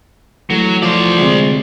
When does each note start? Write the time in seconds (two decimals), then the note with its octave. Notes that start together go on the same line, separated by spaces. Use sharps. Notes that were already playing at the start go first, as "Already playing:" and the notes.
0.50 E3 F#3 A3
0.82 F3 C5 D5
1.18 D2 C3 G#3